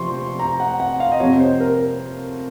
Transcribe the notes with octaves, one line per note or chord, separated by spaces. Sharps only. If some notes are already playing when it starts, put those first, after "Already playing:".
Already playing: C3 F3 C4 C6 C#6
A#5
F#5
F#5
F5
D#5
F2 C3 F3 C#5
C5
A#4